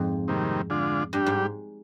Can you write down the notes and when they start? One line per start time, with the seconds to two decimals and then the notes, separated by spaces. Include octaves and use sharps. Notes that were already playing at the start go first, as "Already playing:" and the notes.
Already playing: F2 G#2
0.28 C3 D#3 G3 A#3
0.70 D3 G#3 D4 F4
1.13 G2 G3 D4 G4
1.26 G#2